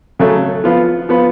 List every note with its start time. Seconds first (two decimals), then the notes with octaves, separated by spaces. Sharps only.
0.19 C#3 F#3 A3
0.64 F3 B3 F4
1.09 F3 B3 F4